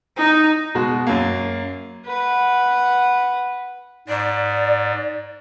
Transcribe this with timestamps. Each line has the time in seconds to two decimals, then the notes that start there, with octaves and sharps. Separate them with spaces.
0.16 D#4
0.75 B2 G#3 F#4
1.07 F#2 A#3
2.05 B4 F#5
4.08 G#2 D5